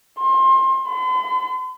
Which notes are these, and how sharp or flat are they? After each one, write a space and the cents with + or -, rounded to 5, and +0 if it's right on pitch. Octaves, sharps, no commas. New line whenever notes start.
C6 +25
C6 -45